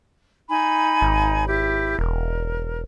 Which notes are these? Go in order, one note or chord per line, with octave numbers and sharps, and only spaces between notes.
D#4 G#5 B5
G#1
E4 G4
E1 A#4